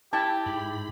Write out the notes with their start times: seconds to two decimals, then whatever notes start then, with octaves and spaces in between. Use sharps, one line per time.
0.13 E4 G4 G5 A5
0.46 G#2 B5